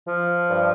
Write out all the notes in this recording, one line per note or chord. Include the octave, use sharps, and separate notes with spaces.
F3
G2